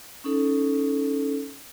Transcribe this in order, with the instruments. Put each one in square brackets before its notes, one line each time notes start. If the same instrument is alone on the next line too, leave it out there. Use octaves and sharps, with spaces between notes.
[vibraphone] C#4 D#4 A4